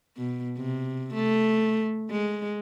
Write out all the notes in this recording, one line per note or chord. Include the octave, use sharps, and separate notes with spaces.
B2
C3
A3
G#3